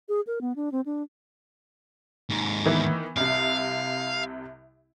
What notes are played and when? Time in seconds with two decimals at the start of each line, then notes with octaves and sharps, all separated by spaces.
0.09 G#4
0.27 A#4
0.41 B3
0.56 D4
0.72 C4
0.86 D4
2.30 D#2 G#2
2.66 D#3 E3 B3
3.17 C2 C3 F5